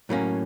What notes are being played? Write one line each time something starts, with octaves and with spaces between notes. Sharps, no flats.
A2 F#3 A#3 C#4